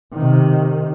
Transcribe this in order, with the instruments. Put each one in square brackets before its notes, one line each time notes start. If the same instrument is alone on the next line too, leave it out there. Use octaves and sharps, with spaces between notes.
[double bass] C3 D#3